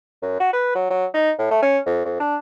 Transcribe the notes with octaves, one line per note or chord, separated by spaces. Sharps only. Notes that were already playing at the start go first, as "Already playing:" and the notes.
F#2
F#4
B4
F#3
F#3
D#4
A2
A3
C#4
F2
F2
D4